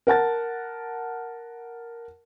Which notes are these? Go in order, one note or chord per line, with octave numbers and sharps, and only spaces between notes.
A#4 F#5 A5 A6